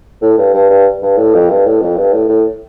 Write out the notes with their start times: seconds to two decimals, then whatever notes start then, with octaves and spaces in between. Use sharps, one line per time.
0.22 A2
0.38 G2
0.54 G2
0.70 G2
1.02 G2
1.17 A2
1.34 F2
1.50 G2
1.66 A2
1.81 F2
1.97 G2
2.13 A2
2.29 A2